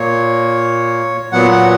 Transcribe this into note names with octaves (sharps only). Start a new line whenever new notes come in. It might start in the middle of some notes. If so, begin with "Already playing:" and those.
Already playing: A#2 A#3 C#5
A#2 F#3 B3 F#5
F#5